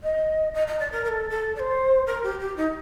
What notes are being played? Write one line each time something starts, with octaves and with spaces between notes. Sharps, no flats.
D#5
D#5
D#5
D5
A#4
A#4
A4
A4
D5
C5
A#4
G4
G4
D#4